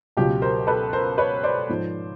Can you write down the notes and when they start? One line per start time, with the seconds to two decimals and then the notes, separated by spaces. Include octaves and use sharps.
0.17 C#2 B2 F#3 F4 G4
0.42 A#4 C5
0.67 A4 B4
0.93 A#4 C5
1.18 B4 C#5
1.43 C5 D5
1.69 G#2 F3